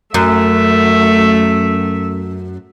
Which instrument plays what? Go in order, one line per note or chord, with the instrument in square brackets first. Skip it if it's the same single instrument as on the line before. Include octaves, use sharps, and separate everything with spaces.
[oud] F#2 [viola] A3 E5